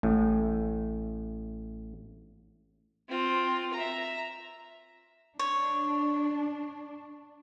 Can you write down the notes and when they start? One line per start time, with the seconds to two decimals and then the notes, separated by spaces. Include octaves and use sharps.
0.03 A1 A2
3.09 C4 F4
3.73 E5 A#5
5.39 D4 C#5